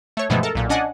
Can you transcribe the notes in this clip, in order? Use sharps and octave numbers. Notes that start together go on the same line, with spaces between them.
A3 C#5
G2 B2 E3 F3 G#3 A3
A4 A#4
B1 A#2
C#4 D4 D#5 F#5 G#5